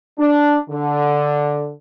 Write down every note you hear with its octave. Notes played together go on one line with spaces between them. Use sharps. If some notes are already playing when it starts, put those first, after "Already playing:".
D4
D3